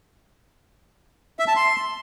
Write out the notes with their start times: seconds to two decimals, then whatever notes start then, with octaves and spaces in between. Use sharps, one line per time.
1.39 E5
1.48 A5
1.56 C6